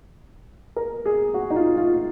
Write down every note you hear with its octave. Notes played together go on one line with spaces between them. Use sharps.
A#4
G#4
F#4
D#4
F4
F4